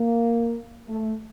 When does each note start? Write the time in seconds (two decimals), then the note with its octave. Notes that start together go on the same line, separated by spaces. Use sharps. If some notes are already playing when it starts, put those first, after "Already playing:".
Already playing: A#3
0.88 A3